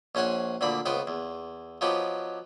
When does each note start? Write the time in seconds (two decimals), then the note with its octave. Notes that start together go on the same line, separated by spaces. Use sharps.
0.15 A#1 C#4 C5 F#5 G#5
0.61 D2 A#2 D3 B5
0.86 C#2 B3 C5 G5
1.07 E2
1.81 F3 F#3 B3 D#4 G4